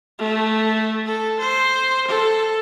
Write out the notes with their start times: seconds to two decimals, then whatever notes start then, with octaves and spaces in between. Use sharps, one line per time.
0.19 A3
1.06 A4
1.40 C5
2.08 A4